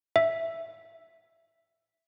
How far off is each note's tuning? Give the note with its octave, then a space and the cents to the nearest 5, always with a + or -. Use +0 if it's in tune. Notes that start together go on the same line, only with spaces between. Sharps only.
E5 +5